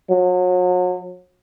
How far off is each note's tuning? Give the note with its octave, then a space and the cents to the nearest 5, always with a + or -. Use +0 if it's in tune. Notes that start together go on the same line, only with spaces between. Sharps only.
F#3 -35